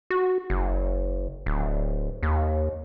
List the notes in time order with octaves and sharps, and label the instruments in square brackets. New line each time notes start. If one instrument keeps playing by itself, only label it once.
[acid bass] F#4
F#1
D1
D#2